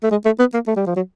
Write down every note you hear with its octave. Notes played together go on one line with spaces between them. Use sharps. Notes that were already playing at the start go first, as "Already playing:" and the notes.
A3
G#3
A3
B3
A#3
A3
G3
F3
F#3